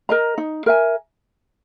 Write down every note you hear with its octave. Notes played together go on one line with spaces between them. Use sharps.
A#4 D#5 A#5
D#4
A#4 E5 G#5